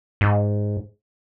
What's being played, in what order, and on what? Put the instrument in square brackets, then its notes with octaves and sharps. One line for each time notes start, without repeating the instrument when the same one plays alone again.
[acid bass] G#2